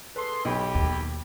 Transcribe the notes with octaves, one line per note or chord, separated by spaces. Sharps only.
G#4 A4 B4 C6
B1 G4 G5 B5
D#2